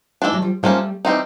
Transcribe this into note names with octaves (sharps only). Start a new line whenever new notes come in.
E3 A3 D4
F#3 G#3
F3 G3
F3 G3 A3 A#3 C#4
E3 G3 C4 D#4